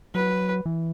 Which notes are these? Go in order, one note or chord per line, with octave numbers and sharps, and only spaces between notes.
F#3 B4
E3